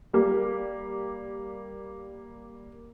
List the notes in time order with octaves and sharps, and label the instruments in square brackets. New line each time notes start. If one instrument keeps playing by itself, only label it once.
[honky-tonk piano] G3 A#3 G4